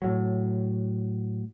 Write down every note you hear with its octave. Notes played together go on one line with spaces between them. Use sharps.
A2 F#3